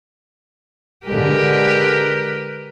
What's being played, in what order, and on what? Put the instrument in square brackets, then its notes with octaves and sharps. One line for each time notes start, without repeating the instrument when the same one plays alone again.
[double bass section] D3 G#3 [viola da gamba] G4 A#4 B4